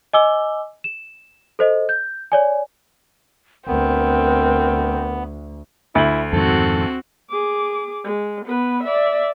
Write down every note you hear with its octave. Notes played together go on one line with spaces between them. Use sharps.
D#5 G#5 D6 E6 G7
E7
A4 C5 D#5
G6
C#5 D5 G#5
D2 B3 C4 A#4
D2 E4 F#7
F2 G#2 D#3 C4 F#4 A4
G#4 D6
G#3
B3 B4
D5 E5